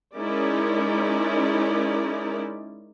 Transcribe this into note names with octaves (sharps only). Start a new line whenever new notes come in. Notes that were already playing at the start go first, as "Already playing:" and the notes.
G#3 C#4 D#4 E4 A#4 D5